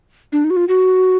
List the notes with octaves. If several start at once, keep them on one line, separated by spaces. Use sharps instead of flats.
D4
D#4
F#4
F4
F#4